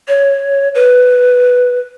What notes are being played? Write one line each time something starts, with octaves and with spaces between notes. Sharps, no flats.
C#5
B4